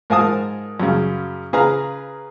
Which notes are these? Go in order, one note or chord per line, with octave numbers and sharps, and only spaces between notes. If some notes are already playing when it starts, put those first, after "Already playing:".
G#2 A#4 F5 G#5 A5 D#6
F#2 C#3
C#3 G#4 B4 F5 A#5